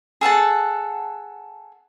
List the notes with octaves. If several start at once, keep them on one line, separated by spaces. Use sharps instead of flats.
G#4 A4 F#5 A5